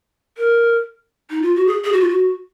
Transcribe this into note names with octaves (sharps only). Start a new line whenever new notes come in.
A#4
D#4
F4
F#4
G#4
G#4
F#4
F4
F#4